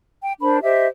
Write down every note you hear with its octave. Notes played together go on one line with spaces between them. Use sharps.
G5
D4 A#4 C5 B5
G4 C5 D#5 E5